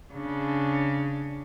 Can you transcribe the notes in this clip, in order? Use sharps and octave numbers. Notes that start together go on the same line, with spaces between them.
C#3 D4